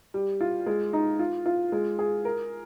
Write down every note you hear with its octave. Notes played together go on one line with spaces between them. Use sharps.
G3
F4
G#3
D#4
F4
F4
G#3
G#4
A#4